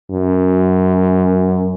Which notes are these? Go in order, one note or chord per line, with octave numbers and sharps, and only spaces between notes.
F#2